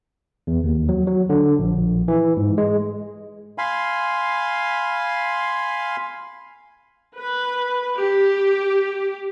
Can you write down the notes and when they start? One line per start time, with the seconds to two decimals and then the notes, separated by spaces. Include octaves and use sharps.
0.47 E2
0.64 D#2
0.89 F#3
1.07 F#3
1.29 D3
1.59 A#1
2.08 E3
2.37 G#2
2.58 G#3
3.58 F5 G#5 B5 C6
7.17 B4
7.98 G4